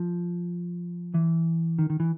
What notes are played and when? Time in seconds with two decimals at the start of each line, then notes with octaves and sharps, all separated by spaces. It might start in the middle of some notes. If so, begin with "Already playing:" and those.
Already playing: F3
1.14 E3
1.79 D#3
1.90 D#3
2.00 E3